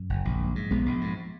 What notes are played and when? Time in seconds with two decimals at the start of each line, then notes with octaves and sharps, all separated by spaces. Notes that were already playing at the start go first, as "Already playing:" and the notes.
Already playing: F#2
0.09 F#1
0.25 A#1
0.40 G#2
0.55 G#2
0.71 A#1 G#3 B3
0.86 A#1
1.01 G#2